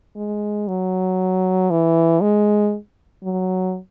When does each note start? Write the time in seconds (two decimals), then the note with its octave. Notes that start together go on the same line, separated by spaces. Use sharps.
0.16 G#3
0.68 F#3
1.70 E3
2.22 G#3
3.24 F#3